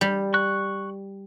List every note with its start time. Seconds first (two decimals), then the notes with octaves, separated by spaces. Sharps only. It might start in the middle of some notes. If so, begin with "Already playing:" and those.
0.01 G3
0.34 C#6 F#6